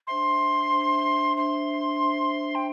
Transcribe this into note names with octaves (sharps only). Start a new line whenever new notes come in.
D4 C5 E5 C6
D4 C5 E5
D4 C5 E5 C6
D4 C5 E5
G5